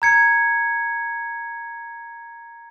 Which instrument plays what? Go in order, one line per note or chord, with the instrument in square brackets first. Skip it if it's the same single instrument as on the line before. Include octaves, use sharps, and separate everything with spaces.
[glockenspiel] A#5 G#6 C#7